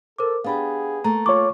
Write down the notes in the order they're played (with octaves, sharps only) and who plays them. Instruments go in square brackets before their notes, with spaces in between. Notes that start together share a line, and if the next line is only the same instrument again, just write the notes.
[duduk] A4 [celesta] A#4 C5 D6
[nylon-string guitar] B3 D4 G4 [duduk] G#4 [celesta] F5 B5
[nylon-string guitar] A3 A#3 [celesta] A#5
[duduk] F4 [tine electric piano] C#5 D6 [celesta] C#6